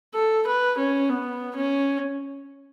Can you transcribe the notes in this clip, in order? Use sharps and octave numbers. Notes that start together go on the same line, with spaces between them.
A4
B4
C#4
B3
C#4